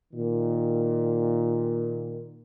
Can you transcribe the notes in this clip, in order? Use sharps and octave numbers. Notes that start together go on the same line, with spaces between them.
A#2 D#3